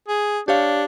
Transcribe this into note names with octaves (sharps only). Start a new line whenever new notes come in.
G#4
D4 G4 C#5 F5